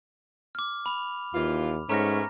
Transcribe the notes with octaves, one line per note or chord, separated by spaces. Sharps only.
D6 F6
B5 F7
D#2 E3 F4
G#2 A3 B3 C#4 A#5 F6 A#6